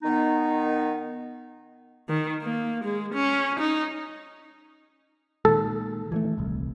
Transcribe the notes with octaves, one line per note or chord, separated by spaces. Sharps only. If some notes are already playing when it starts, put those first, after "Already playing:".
D#3 B3 D#4
D#3
A#3
G#3
C#4
D#4
A#2 D#3 G#3 A4
E3 F3 A3
D#1 C2